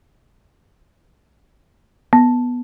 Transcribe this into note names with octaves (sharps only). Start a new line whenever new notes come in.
B3